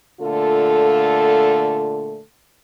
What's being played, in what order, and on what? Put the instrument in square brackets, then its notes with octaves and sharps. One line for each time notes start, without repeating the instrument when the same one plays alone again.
[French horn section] A#2 D3 A3 F4 A4